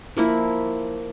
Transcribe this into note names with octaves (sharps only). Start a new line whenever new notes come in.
F3 A#3 E4